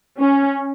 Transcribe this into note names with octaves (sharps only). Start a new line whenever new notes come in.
C#4